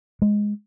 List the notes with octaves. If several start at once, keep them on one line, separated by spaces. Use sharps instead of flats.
G#3